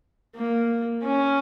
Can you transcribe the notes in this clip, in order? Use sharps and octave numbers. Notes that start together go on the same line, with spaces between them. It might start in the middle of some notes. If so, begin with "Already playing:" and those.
A#3
C#4